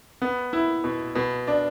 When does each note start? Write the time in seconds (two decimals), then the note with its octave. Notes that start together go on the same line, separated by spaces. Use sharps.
0.22 B3
0.53 E4
0.84 B2
1.15 B2
1.47 D4